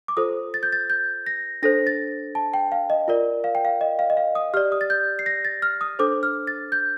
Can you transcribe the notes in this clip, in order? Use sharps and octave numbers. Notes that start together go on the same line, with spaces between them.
D6
F4 A4 C5 D#6
A6
G6
A6
G6
A#6
D4 A4 C5 A#6
A6
A5
G5
F5
D#5
F4 A#4 D5
F5
G5
F5
D#5
F5
D#5
F5
D#6
G4 D5 F6
D#6
A6
G6
C7
A#6
A6
F6
D#6
D4 A4 C5 D6
F6
A6
G6